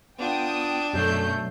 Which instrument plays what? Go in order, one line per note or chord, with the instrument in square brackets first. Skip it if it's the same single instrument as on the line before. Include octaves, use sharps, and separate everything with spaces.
[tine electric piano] B3 F4 [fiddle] D4 [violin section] G5 D#6
[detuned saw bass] F#2 [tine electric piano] B2 F#3 C7 [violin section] A3 G6 C#7